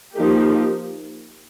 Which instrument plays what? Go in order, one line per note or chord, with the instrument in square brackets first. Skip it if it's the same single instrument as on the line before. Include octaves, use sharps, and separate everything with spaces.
[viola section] F3 A#3 D#4 G4